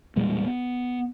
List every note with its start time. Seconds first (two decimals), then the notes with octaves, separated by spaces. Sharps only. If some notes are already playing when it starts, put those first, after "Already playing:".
0.16 E1 A#2 G3 G#3
0.47 B3